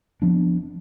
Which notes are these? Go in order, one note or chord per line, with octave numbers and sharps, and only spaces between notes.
F3 B3 C4 D4